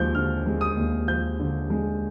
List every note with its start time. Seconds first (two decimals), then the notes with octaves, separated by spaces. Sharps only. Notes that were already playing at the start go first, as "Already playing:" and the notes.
Already playing: D#2 F3 G#3 G6
0.15 D3 F6
0.46 G#3
0.61 D#6
0.77 D#2
1.08 F3 G6
1.40 D3
1.70 G#3